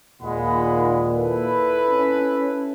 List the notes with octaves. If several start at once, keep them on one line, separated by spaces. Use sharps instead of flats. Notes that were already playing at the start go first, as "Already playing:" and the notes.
D#2 A#2 G#3 F#5 B5
E4 A4 B4
C#4